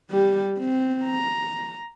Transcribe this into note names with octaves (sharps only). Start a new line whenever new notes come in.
G3 G4
C4
A#5